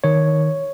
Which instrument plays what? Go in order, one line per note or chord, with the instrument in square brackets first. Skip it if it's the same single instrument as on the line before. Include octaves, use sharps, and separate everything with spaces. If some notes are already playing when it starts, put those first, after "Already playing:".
[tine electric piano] D#3 C#5